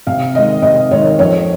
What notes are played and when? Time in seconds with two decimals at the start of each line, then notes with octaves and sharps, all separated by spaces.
0.07 C3 F5
0.35 D#3 G#3 D#5
0.62 C3 D#5
0.91 D#3 G#3 C#5
1.19 F2 C#5